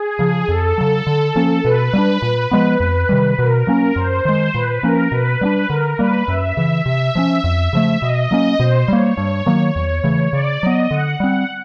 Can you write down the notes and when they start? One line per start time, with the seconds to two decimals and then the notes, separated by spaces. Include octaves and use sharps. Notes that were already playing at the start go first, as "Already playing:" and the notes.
Already playing: G#4
0.19 C#3 F3
0.48 F2 A4
0.78 C#3 F#3
1.07 D3
1.36 F3 A#3 C#4
1.64 B2 B4
1.93 G3 A#3 D4
2.22 A#2
2.51 F3 G#3 B3
2.80 F2
3.09 C3 D#3 G3
3.38 B2 A#4
3.67 F#3 A#3 C#4
3.96 F#2 C5
4.25 D#3 G#3
4.54 A#2 B4
4.83 F3 A#3 C#4 A#4
5.12 B2 B4
5.41 G3 B3 D4
5.70 D3 A#4
5.99 G3 A#3 B4
6.28 F#2 E5
6.57 C#3 E3
6.86 C3 E5
7.15 F3 G#3 C#4
7.44 F2
7.73 C#3 F3 A3
8.01 B2 D#5
8.31 F#3 A#3 C#4
8.59 B2 C5
8.88 G3 A#3 C#5
9.18 G2
9.46 D#3 F#3 A#3
9.76 E2
10.04 C#3 E3 A3
10.33 C#3 D5
10.62 F#3 B3 D#5
10.91 D3 F#5
11.20 G3 C4 F#5